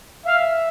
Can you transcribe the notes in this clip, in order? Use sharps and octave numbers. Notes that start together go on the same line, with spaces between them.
E5 F5